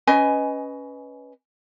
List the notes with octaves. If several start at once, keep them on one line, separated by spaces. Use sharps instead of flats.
C#4 B4 D#5 G#5